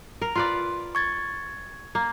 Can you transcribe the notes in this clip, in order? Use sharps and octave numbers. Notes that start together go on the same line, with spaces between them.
A#4
F4 B4 D5 C6
C#6 G#6 A6
A#3